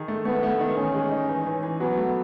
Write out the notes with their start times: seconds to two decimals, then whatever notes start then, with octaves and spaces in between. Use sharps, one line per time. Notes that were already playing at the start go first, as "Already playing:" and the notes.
Already playing: D#3 G#4
0.08 A3
0.25 A3 B3
0.43 A3
0.60 D#3
0.77 E3 C#4
0.94 G#3
1.12 D#4
1.29 E3
1.46 E3
1.63 E3
1.80 F#3 B3
1.97 A3